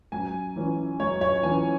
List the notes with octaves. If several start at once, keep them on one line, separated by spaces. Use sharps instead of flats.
F#2 G#5
E3 C#4
F#2 C#5
C#5
E3 C#4 G#5